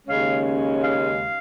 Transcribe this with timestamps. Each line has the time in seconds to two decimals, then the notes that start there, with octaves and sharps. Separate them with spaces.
0.07 D#2 C#3 G#3 C#4 F5
0.82 F5